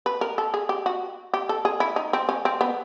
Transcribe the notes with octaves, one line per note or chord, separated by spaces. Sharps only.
B4
A#4
A4
G#4
G4
F#4
G4
A4
G#4
E4
D#4
C4
C#4
C4
B3